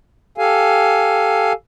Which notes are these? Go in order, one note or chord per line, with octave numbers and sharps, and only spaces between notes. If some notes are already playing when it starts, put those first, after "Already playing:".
G4 A4 F5 G#5